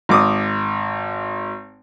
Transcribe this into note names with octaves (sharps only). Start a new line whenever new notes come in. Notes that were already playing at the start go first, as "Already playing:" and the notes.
G#1 D6 D#6